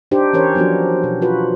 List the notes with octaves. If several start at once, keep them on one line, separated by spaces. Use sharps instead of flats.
D4 D#4 G4 C5
E3 C#4 A#4 C5 C#5
F3 F#3 B3 D4 F#4
B2
F4 F#4 B4